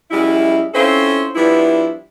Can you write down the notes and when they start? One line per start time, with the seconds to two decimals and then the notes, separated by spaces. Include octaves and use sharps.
0.11 F#2 G3 G#3 E4
0.74 C4 C#4 E4 F4 A4 C5
1.35 F3 G3 B3 D4 E4